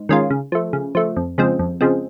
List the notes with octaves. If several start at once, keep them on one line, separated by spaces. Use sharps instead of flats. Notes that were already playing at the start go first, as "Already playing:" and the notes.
Already playing: G#2
D#3 G#3 C#4 F4
C#3
F3 A3
C#3
F3 A3
F2
C#3 F3 G#3 C4
F2
C#3 F3 G#3 C4